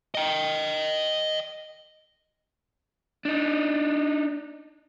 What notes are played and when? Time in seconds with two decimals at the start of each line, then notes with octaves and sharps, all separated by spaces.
0.15 D#5 G5
3.25 D4 D#4